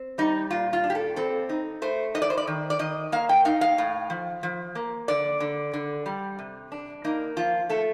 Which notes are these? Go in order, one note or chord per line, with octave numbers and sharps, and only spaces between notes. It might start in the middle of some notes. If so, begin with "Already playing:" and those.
Already playing: C4
G3 D#4
A#2 F4
F4
D4
G4
A4
C4 A4
D#4
A3 C5
D#4 D#5
D5
C5
D5
D#3
D5
D#3 D#5
A#3 F5
G5
D#4 F5
F5
A2
F3
F3
A#3
D3 D5
D3
D3
G3
C3
D4
A#3 D#4
F3 F4
A3 A4